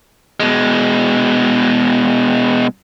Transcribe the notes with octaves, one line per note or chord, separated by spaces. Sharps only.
B2 G#3